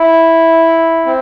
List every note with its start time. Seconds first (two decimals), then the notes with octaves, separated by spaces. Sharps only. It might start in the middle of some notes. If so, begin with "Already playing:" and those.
Already playing: E4
1.06 C4